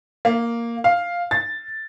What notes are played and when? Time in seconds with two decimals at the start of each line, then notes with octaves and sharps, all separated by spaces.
0.25 A#3
0.84 F5
1.31 A6